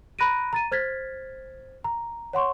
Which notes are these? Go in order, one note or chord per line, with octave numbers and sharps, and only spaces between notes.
A#5 B5 F#6 A#6 D7 D#7
A#5 A6 D#7
C5 F6 G#6 A6 B6
A#5
C#5 F#5 C6 C#6